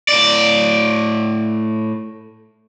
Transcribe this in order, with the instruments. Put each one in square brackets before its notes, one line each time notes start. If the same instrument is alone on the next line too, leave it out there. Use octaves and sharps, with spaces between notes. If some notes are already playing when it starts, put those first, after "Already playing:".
[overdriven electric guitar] A2 D5